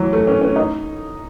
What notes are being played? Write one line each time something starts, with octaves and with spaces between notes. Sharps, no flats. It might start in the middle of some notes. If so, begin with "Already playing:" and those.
Already playing: E3 F#3
A3
C#4
C#4
D#4